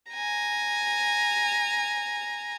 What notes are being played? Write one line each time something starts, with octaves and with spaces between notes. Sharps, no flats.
G#5 A#5